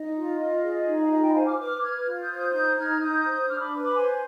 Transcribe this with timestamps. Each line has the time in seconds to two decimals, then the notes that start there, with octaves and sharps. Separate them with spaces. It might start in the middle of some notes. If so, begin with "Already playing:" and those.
Already playing: D#4 D#5
0.16 F4
0.39 F4
0.63 G#4
0.87 D#4
1.01 F5
1.10 F4 D#5
1.22 D#5 G5
1.29 B5
1.34 C5 F5 G#5
1.46 D6 F6
1.58 B4 D6 F6
1.81 B4 F6 G#6
2.05 F4
2.21 D#6 G6
2.29 C5 G#6
2.37 D#6 G6
2.53 D#4 D#6 G6
2.77 D#4 F6 G#6
3.00 D#4 D#6 G6
3.25 C5
3.47 D4 D6 F6
3.55 D#6
3.59 B5 D6
3.72 B4
3.83 B5 D6
3.95 C5 G#5 C6